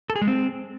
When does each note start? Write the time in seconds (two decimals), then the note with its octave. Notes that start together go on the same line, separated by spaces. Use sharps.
0.10 A4
0.16 G#4
0.22 G#3
0.28 C4